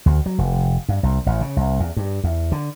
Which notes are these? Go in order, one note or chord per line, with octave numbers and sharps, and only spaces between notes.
D2
F#3
F1
G2
C2
A1
C#3
C2
E2
G2
E2
D3